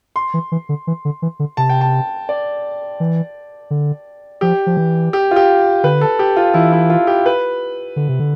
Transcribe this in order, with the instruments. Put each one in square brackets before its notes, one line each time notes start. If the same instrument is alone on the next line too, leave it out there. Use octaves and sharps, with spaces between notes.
[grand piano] C6
[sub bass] E3
E3
D3
E3
D3
E3
D3
[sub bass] C3 [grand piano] A5
[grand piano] G5
A5
D5
[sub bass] E3
D3
[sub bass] F3 [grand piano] G4
[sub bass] F3
E3
[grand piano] G4
F4
G4
[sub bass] D3 [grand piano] B4
[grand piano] A4
G4
F4
[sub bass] E3 [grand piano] E4
[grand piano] E4
F4
G4
B4
[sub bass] D3
C3
D3